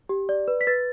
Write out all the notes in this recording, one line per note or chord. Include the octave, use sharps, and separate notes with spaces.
G4
D5
B4
B6
B4 A6